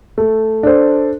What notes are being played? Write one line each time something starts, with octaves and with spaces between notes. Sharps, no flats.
A3
D4 A4 C5